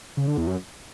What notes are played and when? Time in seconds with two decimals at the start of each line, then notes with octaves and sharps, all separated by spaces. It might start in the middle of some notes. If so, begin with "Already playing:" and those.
0.17 C#3
0.27 D3
0.37 E2
0.47 F#2